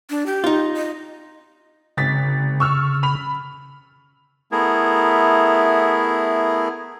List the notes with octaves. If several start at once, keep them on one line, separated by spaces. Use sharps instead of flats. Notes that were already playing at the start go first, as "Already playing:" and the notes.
D4
G4
D#4 F4
D#5
G#1 C#3 A6 B6
C#6 E6 F6
B5 F7
A3 B3 E4 G#4 A#4